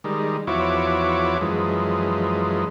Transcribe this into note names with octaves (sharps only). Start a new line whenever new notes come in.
D#3 G3 G#3
E2 F3 E4 F#4 C#5 D6
F#2 E3 F3 G#3